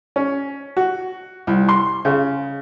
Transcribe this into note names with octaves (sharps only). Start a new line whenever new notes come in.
C#4
F#4
C2
C6
C#3